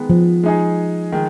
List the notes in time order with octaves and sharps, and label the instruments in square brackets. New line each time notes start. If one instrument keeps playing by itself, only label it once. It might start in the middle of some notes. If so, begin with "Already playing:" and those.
Already playing: [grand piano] D#3 G#3 B3
[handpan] F3
[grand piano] G#3 D#4 G#4
D#3 G#3